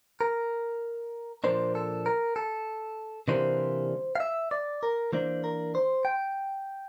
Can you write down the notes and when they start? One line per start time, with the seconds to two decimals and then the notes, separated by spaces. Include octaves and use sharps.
0.21 A#4
1.44 A#2 F3 A#3 D4 C5
1.75 A4
2.06 A#4
2.36 A4
3.28 C3 E3 G3 A#3 D4 C5
4.15 F5
4.20 E5
4.51 D5
4.83 A#4
5.13 E3 A#3 D4 C5
5.44 A#4
5.75 C5
6.05 G5